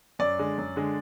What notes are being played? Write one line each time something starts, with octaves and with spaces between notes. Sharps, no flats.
F#2 D5
D3 G#3
F#2
D3 G#3